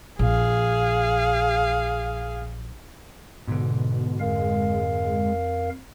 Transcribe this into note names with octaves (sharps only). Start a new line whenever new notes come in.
A#1 G#4 F5
G#2 B2 D3
F2 G#3 A#4 F5